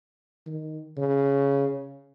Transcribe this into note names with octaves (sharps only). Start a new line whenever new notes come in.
D#3
C#3